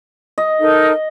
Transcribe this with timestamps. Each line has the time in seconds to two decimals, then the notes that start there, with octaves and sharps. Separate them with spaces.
0.38 D#5
0.60 D#4 A4 A#4